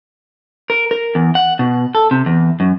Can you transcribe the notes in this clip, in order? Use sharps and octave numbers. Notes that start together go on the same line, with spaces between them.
A#4
A#4
E2
F#5
B2
A4
C3
E2
F#2